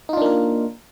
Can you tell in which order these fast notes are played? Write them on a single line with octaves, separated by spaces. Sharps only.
D#4 F4 D4 A#3 A#4